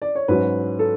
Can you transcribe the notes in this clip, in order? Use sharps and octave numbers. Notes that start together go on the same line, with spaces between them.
D5
C#5
G#2 F#3 C#4 B4
A4